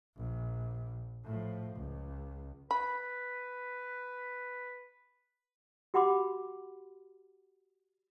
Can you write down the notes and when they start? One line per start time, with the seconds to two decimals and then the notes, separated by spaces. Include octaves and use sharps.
0.17 A#1
1.24 A2 F3
1.76 C#2
2.71 B4 B5
5.94 F#4 G4 F#5 B5 C6 D6